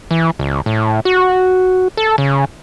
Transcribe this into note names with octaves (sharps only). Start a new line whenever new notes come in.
E3
C#2
A2
F#4
A4
C#3